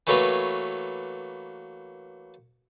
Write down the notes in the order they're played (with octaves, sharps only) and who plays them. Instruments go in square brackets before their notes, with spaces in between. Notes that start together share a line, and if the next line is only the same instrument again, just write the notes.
[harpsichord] E3 F#3 A3 A#3 B4 C#5